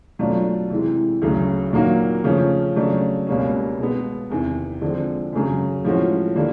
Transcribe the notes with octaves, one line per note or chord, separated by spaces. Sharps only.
B2 F#3 A3 D4 F4
C3 E3 G#3
D2 C#3 F#3
A#2 F#3 A#3 D#4 F#4
C#3 F3 A3 C#4
C#3 F#3 A3 D4
C#2 B2 G3 A#3 C#4
B2 G#3 B3
E2 C3 D#3
D3 F3 G#3 C4
F#2 C#3 F#3
A2 F3 G#3 C#4 F#4
D3 G3 A#3